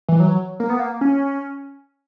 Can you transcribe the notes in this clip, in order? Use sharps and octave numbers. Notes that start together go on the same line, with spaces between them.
E3
F#3
A#3
B3
A#3
C#4